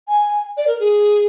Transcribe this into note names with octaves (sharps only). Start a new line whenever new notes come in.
G#5
D5
A#4
G#4